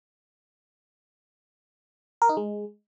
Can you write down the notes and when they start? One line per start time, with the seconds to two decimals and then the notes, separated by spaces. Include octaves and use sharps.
2.22 A#4
2.29 D#4
2.37 G#3